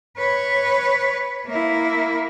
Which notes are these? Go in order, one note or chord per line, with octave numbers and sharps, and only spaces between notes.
B4 C#5
A#3 E4